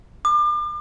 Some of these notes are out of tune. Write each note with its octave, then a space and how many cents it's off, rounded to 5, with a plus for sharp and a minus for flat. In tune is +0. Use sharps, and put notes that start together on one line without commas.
D6 +35